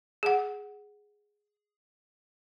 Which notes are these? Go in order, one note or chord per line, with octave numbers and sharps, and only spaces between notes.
G#4 F#5